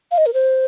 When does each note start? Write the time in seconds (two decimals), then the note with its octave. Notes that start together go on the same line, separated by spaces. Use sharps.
0.11 F5
0.18 D#5
0.26 A#4
0.34 C5